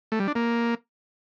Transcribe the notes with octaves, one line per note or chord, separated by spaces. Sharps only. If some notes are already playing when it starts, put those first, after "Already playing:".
A3
G3
D4
A#3